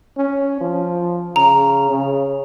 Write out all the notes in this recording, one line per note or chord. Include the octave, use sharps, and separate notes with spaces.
C#4
F3
C#3 A#5
C#3